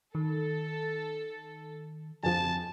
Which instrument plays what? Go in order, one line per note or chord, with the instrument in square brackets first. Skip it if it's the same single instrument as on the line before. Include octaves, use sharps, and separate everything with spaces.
[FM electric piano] D#3 [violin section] A4
[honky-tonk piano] F2 F3 [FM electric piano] G#5 [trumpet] A5